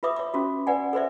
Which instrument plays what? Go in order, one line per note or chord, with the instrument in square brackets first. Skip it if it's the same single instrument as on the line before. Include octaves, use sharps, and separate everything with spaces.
[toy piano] F4 B4 E5 D6 D#6
C#5 D6
C#4 F4 F#4
B4 D5 F#5 G#5
A4 B4 C5 D5 E5